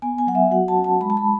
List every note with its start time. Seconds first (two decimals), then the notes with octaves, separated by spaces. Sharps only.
0.02 B3 G#5
0.18 G#5
0.27 F#3 F#5
0.35 E5
0.51 F#4 F#5
0.68 A5
0.77 C#4
0.84 A5
1.01 G#3 B5
1.10 A5
1.17 B5